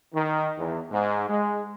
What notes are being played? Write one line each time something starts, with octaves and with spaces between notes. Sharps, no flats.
D#3
E2
G#2
G#3